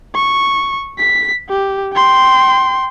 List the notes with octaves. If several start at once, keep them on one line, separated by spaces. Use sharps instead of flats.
C#6
B6
G4
G5 C6